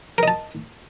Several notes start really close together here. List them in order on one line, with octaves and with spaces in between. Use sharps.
A#4 D#5 A5